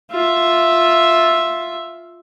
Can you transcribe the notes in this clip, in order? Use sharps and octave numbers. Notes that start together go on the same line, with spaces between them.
F4 E5